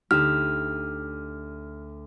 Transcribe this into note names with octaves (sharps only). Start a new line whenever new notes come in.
D2 D#4 G4 F6 E7